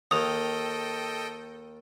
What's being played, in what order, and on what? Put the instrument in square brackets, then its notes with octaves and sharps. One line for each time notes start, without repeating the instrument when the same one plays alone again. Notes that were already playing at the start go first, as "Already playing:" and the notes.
[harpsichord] D#2 [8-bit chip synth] A4 D#5 G5 [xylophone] D#6 F7